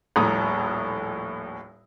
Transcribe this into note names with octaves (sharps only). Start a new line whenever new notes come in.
D#1 A#1 A2 A#5 D#6